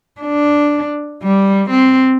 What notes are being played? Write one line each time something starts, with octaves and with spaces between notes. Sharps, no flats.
D4
G3
C4